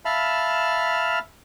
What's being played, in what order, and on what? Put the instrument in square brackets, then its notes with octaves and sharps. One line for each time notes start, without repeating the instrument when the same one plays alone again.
[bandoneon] E5 F5 A5 B5 F6